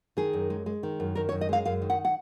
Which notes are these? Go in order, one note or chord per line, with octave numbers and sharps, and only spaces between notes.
D#3 G#4
F#2
G#3
G#3
D#3
F#2
D#3 A#4
C#5
F#2
D#5
G#3 F5
F#2 F5
D#3
F#5
F#5